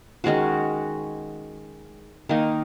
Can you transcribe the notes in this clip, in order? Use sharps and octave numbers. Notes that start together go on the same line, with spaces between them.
D#3 G#3 C#4 F#4
D#3 A#3 D#4